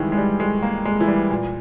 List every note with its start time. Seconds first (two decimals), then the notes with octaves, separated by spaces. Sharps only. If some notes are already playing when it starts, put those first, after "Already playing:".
Already playing: D#3 E3 G3 G#3
0.12 G#3
0.17 G3
0.40 G#3
0.63 A#3
0.85 G#3
1.00 E3
1.08 G3
1.30 A#2